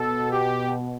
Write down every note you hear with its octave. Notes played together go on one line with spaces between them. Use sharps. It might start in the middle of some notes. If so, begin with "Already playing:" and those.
Already playing: B2 A4
G4